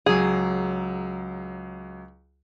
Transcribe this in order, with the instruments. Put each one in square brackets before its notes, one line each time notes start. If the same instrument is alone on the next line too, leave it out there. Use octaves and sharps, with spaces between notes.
[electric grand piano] C#2 F#3 [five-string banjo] G#4